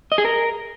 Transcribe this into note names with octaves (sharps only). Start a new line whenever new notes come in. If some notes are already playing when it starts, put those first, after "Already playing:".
D#5
G#4
A#4